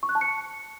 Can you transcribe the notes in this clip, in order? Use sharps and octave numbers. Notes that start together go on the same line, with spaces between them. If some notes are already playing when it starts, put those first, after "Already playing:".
C#6
F#6
A5
C#7